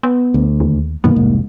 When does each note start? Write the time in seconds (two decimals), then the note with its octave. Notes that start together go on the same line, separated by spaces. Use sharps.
0.03 B3
0.34 D2
0.60 D#2
1.04 F#2 B2 D#3 A#3
1.16 F1 C2 G#2